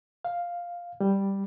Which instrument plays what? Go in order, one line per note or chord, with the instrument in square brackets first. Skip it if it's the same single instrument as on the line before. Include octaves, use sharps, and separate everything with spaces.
[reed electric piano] F5
G3